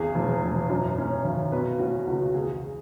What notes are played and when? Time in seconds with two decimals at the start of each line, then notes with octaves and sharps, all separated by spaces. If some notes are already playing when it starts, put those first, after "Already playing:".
Already playing: G#1 E2 G#4
0.15 E1
0.43 E1
0.70 F#2
0.98 C#4
1.24 G#1
1.52 B2 B4
1.79 C#4 F#4
2.07 C#2 F#4
2.35 E2 G#4